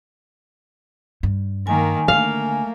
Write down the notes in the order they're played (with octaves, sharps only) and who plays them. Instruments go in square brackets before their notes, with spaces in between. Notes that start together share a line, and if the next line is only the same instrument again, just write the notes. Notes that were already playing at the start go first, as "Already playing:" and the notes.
[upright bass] G2
[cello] D#3 A#3 [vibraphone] G#5
[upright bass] D3 [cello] A3 A#3 [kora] F5